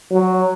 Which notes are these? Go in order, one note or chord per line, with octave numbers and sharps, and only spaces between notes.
F#3